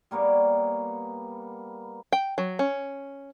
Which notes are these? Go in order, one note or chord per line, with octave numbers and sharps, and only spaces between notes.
G3 A#3 B3 C#5
G5
F#3
C#4